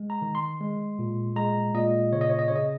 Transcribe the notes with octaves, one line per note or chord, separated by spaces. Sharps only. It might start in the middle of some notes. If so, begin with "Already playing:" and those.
Already playing: G#3
A#5
D#3
C6
G#3
A#2
G#3 A#5
A#2 D#5
C#3 C#5
D#5
C#5
D#5
C#3 C#5
D#5